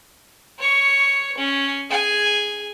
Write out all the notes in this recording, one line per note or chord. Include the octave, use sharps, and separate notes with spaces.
C#5 C#6
C#4
G#4 G#5